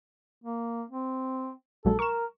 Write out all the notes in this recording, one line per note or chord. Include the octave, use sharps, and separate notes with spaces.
A#3
C4
A#1 F#3 G#3 A4
A#4 C#6 E7